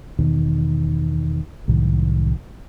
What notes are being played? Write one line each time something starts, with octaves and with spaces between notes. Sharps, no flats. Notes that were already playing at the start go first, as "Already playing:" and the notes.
E2 B2 D#3
C2 A2 D#3 F#3